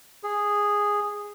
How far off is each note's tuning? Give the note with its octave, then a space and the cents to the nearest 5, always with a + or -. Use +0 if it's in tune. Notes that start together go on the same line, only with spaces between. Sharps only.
G#4 -10